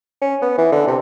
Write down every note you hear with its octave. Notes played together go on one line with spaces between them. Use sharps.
C#4
B3
E3
D3
C3